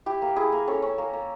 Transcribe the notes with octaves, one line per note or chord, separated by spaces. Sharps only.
E4 G4
A#3
E4 G#4
A#3
C#4 A4
C#4
A#3
A#3